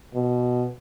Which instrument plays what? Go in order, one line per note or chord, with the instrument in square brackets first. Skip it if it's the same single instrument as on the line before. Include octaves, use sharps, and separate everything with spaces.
[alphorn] B2